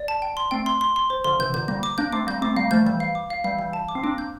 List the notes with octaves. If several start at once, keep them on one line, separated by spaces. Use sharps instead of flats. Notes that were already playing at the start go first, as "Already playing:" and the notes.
Already playing: D5
A5
G5
C6
A3 C4 G5
C6
C6
C6
C5
D3 F3 C6
C3 E3 G6
A#2 D3 G6
G3 A#3 G6
D6
A#3 D4 G6
A3 C4 D6
G3 A#3 G6
A3 C4 D6
G3 A#3 F5
F3 A3 G6
E3 G3 G6
F5
D6
F5
E3 G3 F5
E3 G3 F5
A5
D6
C4
A#3 D4 D6
G6